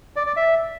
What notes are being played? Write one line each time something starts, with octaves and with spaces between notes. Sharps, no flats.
D5
D5
E5